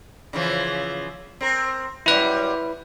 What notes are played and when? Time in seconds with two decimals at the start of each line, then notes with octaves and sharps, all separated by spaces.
0.33 C#3 E3 F3
1.41 C4 A#4
2.06 F#2 G3 E4 B4